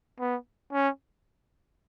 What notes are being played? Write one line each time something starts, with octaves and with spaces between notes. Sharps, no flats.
B3
C#4